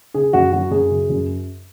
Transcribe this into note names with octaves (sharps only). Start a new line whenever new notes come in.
C#3 G#4
F#2 F#4
F#3 F#4
F#2 G#4
C#3
F#2